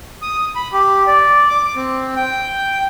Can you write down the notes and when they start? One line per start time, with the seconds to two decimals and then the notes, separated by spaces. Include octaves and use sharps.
0.22 D#6
0.56 B5
0.73 G4
1.07 D5
1.49 D6
1.75 C4
2.16 G5